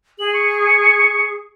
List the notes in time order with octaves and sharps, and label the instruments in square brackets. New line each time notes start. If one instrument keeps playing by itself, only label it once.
[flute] G#4 [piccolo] F#7
[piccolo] C#6